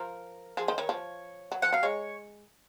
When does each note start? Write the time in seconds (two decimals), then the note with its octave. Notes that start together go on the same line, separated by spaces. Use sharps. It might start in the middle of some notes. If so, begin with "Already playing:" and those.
Already playing: F3 A#4
0.57 F3 G#4
0.68 D#3 C5
0.78 D#3 C#5
0.89 F3
1.52 F#3
1.62 F3 F#5
1.73 F#3 F5
1.83 G#3 C#5